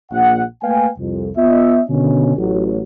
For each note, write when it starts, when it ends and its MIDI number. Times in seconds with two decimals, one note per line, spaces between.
0.12 0.43 34
0.12 0.43 78
0.63 0.89 57
0.63 0.89 58
0.63 0.89 71
0.63 0.89 77
0.63 0.89 79
0.63 0.89 80
0.98 1.30 36
0.98 1.30 41
1.37 1.81 59
1.37 1.81 65
1.37 1.81 75
1.37 1.81 76
1.89 2.37 47
1.89 2.37 50
1.89 2.37 51
1.89 2.37 61
2.37 2.81 33
2.37 2.81 54